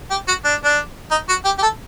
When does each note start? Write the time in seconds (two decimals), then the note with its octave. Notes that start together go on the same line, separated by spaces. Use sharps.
0.11 G4
0.28 F#4
0.44 D4
0.64 D4
1.11 D#4
1.29 F#4
1.45 G4
1.59 G4
1.62 A4